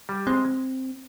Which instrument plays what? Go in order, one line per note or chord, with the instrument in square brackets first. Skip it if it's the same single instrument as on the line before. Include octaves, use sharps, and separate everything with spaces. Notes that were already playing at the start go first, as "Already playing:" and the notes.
[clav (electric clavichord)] G3
[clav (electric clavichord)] G#3 [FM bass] C4